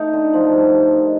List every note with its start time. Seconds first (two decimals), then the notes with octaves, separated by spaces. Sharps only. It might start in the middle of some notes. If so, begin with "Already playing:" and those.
Already playing: A3 D#4
0.13 D3
0.34 F3
0.53 G3
0.73 G3
0.94 D#3